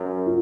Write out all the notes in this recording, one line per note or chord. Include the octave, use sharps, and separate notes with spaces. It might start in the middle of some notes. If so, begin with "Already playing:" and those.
Already playing: F#2
F4